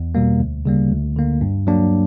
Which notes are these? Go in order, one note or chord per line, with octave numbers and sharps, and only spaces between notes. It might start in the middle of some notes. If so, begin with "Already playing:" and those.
Already playing: E2
B2 G3 A#3
D2
C#3 G3 A#3
D2
D3 A#3
G2
F#3 A#3 D4